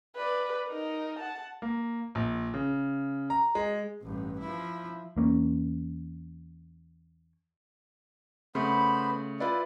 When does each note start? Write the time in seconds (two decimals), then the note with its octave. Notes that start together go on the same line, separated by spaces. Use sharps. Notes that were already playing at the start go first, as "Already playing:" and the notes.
0.16 B4 D5
0.68 D#4 A#4
1.19 F#5 A5
1.62 A#3
2.15 A#1
2.54 C#3
3.30 A#5
3.55 G#3
4.02 A1 G2
4.39 F3 E4
5.16 E2 A#3 C#4
8.55 C#3 A3 B3 C5 B5
9.40 E4 F4 B4 D5